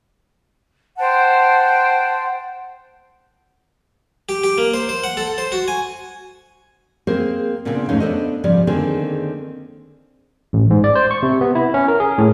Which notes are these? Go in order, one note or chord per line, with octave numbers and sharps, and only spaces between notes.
C5 F#5 G5 A5
G4
G4
A#3
C5
C5
F#5
A4
C5
F#4
G#5
A#3 C4 G#4 A#4 C5
A#2 C#3 B3 C4 D4
E2 G#2 A3 C#4 D#4 F5
B3 D4 A4 C5 D#5
G#2 C#3 F3 G3 D5
D3 D#3 A#3 C4 D4 G#4
A1
G#2
D5
C5
C#6
C3
B3
E4
C#4
A#4
G#4
A2